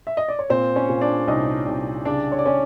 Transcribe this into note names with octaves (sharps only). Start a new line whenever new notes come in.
E5
D#5
D5
C#5
A#2 C4 C5
C#4 C#5
A#2
D4 D5
C2 D#4 D#5
C2
C#3 D4 D5
C#5
D5
C#4 C#5